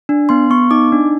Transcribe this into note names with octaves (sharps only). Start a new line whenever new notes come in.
D4
B3 C6
B3 C#6
D#4 D6
D4